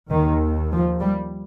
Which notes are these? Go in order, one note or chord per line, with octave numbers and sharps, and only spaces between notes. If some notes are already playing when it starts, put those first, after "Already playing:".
D#2 D#3
F3
G3